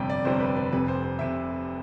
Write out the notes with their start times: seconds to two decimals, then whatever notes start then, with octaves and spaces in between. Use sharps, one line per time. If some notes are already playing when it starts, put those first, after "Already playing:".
Already playing: G1 F2 C3 G3 G5
0.10 D5
0.25 G1 F2 C3 G3 C5
0.40 B4
0.57 B4
0.72 F1 F2 C3 B4
0.88 C5
1.04 C5
1.19 C3 E5